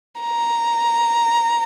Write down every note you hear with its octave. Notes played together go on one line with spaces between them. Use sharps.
A#5